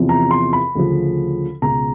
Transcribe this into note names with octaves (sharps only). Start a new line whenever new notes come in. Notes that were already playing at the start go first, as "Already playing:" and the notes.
Already playing: E2 C3 F3
A#5
C6
B5
D2 C#3 F3
C#2 B2 A#5